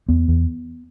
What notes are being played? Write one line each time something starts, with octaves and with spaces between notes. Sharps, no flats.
E2 B3
E2